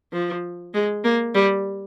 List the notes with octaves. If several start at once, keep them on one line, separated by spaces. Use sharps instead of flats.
F3
G#3
A#3
G3